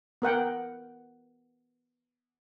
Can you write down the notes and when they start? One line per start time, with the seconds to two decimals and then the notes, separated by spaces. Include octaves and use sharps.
0.22 B3 A#4 F#5 G5